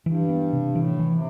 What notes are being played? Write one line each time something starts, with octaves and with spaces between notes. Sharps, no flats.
G2 E3
B3
C3
A2 E3
E3
C3